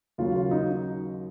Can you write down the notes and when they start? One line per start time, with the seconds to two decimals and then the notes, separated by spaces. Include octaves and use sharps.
0.18 D#2 C#3 F#3 F4
0.35 F4
0.51 D#4